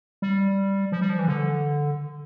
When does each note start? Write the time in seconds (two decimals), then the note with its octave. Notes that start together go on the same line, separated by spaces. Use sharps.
0.22 G3
0.92 F3
1.01 G3
1.10 F3
1.19 E3
1.28 D3